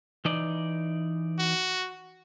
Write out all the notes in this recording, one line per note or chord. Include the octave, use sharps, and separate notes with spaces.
E3 D#4 D5
F#4